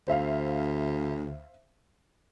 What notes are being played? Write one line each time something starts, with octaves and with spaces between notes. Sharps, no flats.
D2 C5 E5 F5